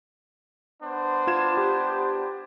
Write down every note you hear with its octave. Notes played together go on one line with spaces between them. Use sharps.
B3 D4 C5
F4 G#6 E7
G4